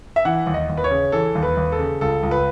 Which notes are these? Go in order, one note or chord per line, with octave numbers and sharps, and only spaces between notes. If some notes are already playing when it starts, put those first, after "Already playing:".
E5
E3 F#5
D#2
D#5
D#2
B4
C#5
C#3
E3 A4
D#2
B4
D#2
A4
C#3
C#2 A4
C#2
B4